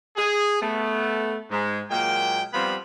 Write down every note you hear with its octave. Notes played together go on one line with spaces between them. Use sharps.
G#4
A3 B3
G#2 G#3
A#2 F#3 G#3 A#3 G5
F3 G3 B3 C4 F5 B5